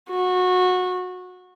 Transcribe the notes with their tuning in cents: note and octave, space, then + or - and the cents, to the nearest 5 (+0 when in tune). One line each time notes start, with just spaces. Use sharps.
F#4 -20